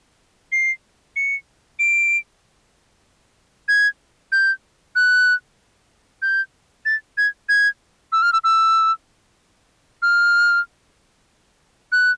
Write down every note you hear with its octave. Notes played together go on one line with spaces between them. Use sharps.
C7
C#7
D7
G#6
G6
F#6
G6
A6
G#6
G#6
E6
F6
E6
E6
F6
F#6